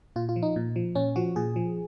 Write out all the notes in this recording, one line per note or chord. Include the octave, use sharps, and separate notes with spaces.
A#2 F4
F4
F3
D#4
A#2
F3
A#2 C#4
F3 F#4
A#2 G#4
F3